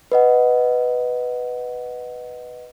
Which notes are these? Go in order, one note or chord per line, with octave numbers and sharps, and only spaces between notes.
B4 D#5 F#5